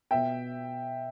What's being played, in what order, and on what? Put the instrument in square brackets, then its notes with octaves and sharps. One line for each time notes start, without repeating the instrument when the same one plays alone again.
[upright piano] B2 B3 E5 G5